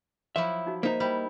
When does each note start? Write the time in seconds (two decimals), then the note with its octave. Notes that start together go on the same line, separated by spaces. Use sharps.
0.36 F3 F#3 E4 E5
0.67 D#4 F#4
0.83 A#3 D#4 C5 E5 A#5
1.00 G3 E4 C5